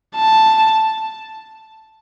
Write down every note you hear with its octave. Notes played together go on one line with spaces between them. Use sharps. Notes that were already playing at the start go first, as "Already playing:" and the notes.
A5